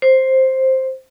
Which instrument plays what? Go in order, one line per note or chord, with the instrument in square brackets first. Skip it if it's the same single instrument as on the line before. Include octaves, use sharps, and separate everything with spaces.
[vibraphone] C5